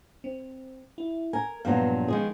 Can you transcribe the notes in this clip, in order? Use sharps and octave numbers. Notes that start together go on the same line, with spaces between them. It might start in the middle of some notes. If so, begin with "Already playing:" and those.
C4
E4
A#4 G#5
G2 A#2 F3 F#3 B3 F5
D#3 G#3 G#4